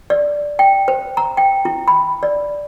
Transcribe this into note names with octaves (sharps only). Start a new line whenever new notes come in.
D5
G5
C5
A#5
G5
E4
B5
D5